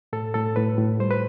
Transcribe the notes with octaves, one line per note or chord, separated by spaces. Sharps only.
A2 A4
A2 A4
A2 B4
A2
G3 C5
B4